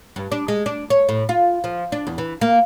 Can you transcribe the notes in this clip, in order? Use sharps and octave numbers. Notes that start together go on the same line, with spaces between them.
G2
D4
G#3
D4
C#5
A2
F4
F3
D4
E2
E3
A#3